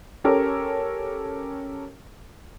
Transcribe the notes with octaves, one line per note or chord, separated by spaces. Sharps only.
C#4 G4 A4 A#4 C#5